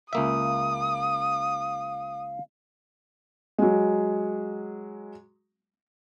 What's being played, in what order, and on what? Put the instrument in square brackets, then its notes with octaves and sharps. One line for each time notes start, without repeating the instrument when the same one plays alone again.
[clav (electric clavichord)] C#2 A#3 E5 [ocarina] F5 [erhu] D#6
[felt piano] F#3 G#3